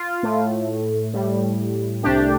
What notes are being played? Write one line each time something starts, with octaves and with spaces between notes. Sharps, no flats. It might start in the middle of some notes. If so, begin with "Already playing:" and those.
Already playing: F4
A2 A3
A2 G3
C2 C3 A3 D4 G4